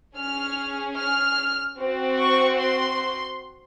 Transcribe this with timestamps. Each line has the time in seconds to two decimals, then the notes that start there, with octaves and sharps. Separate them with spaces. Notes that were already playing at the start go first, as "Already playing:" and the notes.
0.17 C#4 G#4 F6
0.98 F6
1.79 C4 F#4
2.21 C#6
2.61 C6